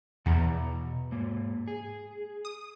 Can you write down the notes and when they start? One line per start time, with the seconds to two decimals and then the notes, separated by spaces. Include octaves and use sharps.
0.26 E2 B2 F#5 A#5
1.12 G#2 A#3
1.68 G#4
2.45 D#6